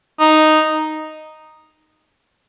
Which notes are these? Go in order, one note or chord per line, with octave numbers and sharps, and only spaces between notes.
D#4